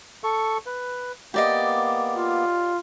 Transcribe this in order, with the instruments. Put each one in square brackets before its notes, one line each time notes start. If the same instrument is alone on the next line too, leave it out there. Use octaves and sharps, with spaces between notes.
[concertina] A4 C#6
B4
[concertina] A#3 B3 [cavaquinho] G4 D5 D#5
[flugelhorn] F4